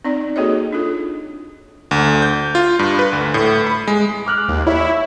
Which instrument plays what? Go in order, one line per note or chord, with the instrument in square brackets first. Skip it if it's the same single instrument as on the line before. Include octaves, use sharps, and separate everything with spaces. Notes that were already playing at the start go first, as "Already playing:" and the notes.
[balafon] C4 D#4 D5
A#3 F#4 G#4 A4 C#5 D#5
D4 D#4 F4 A4
[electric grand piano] D2
G6
F4
G2
B4
D2
A2
B5
G#3
[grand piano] D6 F6 F#6
[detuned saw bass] D#2
[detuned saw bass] E4 [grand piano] C#5